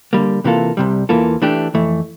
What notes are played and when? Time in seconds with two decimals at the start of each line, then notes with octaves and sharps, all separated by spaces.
0.13 D3 G3 A#3
0.44 C3 E3 A#3 F4 A4
0.77 C2 C3 G3
1.09 E2 E3 A#3 F4 A4
1.42 E3 A3 D4 G4
1.74 F2 E3 A3